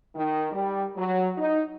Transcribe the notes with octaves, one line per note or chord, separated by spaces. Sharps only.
D#3
G3
F#3
D#4